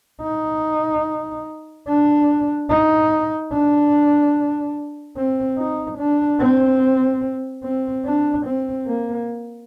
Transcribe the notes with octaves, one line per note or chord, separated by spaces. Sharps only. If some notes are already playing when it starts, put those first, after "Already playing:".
D#4
D4
D#4
D4
C4
D#4
D4
C4
C4
D4
C4
A#3